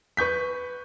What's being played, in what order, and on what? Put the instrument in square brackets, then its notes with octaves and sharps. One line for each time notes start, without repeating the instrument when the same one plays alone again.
[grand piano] B4 C#6 G6 B6